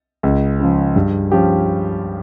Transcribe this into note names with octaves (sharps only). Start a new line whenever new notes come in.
C#2
C#3 F3
G2
F3 C#4 G4